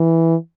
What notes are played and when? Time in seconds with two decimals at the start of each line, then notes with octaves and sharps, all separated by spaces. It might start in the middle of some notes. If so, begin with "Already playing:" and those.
Already playing: E3